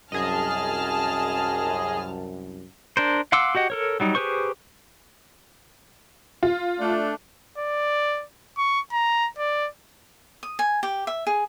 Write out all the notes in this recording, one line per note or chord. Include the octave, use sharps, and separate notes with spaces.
C2 F#2 G#4 D#5 A5 F6
D4 A#4 C5
F5 F#5 C6 D6 E6
F#4 G4 D#5 F#5
A4 A#4 C#5
F#3 G3 D#4
G4 G#4 B4 C5 C#6
F4
A3 D4
D5
C#6
A#5
D5
D#6
G#5
G4
E5
G#4